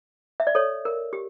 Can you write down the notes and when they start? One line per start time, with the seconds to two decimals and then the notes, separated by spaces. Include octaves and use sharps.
0.40 E5
0.47 D5
0.55 A4 C#5
0.85 A#4
1.13 G4